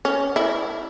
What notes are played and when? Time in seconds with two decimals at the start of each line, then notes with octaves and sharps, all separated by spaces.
0.05 C#4
0.36 E4